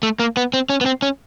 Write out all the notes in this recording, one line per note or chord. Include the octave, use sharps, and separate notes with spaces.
A3
A#3
B3
C4
C#4
B3
C4
C#4